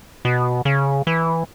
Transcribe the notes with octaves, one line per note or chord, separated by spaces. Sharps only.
B2
C#3
E3